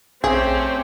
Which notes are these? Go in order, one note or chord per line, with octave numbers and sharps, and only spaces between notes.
A#1 A3 C4 C#4 G4 G#4 G5